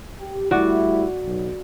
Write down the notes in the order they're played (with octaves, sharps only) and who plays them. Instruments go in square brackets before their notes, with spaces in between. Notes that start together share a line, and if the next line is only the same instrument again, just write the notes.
[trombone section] G4
[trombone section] G3 A3 E4 [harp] F#4 D5
[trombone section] B1